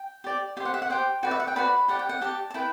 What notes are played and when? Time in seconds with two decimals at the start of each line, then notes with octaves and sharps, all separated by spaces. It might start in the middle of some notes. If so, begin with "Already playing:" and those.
Already playing: G5
0.24 G4 D5
0.57 G4 E5
0.60 C5 F#5
0.74 E5
0.82 F#5
0.90 G4 C5 G5
1.23 F#4 B4 D5 G5
1.31 E5
1.40 F#5
1.47 G5
1.56 F#4 B4 D5 B5
1.88 G4 D5 F#5
1.99 G5
2.09 F#5
2.22 G4 D5 A5
2.50 A5
2.54 E4 B4 G5